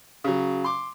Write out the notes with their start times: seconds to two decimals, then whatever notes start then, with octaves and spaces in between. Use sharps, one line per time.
0.24 C#3 F#3
0.64 C6 D6